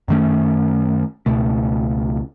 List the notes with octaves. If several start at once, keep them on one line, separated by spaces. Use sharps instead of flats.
F#2 D#3 A3 C#4
C#2 B2 A3